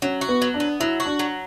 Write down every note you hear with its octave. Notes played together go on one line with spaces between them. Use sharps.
F#3 C#4
F#4
B3
F#3
D4
B3
F#3 E4
F#4
D4
F#3